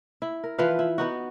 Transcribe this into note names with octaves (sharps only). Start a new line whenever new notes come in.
E4
A#4
E3 F3 B4 F5
E4
B3 D#4 F#4